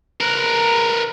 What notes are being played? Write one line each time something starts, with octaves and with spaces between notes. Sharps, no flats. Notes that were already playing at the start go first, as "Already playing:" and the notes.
A#4 B4